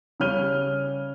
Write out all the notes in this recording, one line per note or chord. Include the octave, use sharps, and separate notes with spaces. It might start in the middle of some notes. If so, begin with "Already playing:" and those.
C#3 G3 C#5 F6 D#7 G7